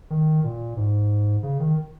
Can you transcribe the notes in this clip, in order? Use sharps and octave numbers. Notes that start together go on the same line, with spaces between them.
D#3
A#2
G#2
C#3
D#3